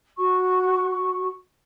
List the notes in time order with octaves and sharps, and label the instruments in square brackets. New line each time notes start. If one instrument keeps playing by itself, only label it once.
[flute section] F#4 C#6